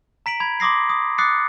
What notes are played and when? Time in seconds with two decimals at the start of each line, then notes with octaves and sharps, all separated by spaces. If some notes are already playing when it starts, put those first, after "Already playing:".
0.26 A#5 B6 D7 F#7
0.40 B5 G#6
0.60 C6 D6 D#6 A#6 C7
0.89 D#6
1.18 D6 D#6 F#6 A6 C7 C#7